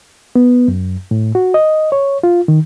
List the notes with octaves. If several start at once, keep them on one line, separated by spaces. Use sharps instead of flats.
B3
F#2
A2
F#4
D#5
C#5
F4
D#3